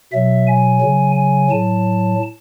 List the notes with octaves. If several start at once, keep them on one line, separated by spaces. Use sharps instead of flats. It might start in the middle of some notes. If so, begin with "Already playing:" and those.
B2 F#3 E5
G#5
C#3 F#3
G#5
A2 F#3 A5